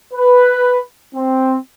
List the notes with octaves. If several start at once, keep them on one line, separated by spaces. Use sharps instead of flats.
B4
C4